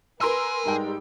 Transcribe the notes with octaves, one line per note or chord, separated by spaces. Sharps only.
G#4 A#4 B4 C6 E6
G#2 G3 G#3 G5